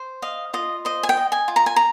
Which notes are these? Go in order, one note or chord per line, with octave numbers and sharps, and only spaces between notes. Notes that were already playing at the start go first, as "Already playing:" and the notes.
Already playing: C5
D#5 F5
F4 D#5
C5 D#5
G#5
G5
D#5
G#5
F4
A#5
G#5
A#5